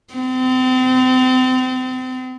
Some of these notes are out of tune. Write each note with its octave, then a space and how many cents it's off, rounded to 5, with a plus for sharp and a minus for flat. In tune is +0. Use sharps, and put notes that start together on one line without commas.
C4 -35